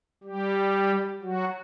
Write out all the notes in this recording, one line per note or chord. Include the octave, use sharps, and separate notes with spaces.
G3 G4
F#3 F#4